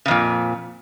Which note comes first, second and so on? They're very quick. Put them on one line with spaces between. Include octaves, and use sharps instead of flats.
C#3 F2 A#2